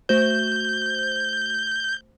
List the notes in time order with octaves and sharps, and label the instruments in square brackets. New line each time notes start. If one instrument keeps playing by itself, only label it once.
[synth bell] A3 F#4 C5 [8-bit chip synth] G6